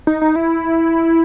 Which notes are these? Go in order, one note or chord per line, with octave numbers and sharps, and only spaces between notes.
D#4
D#4
E4